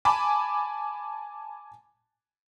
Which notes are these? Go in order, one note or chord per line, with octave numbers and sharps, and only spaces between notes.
G#5 A5 B5 D6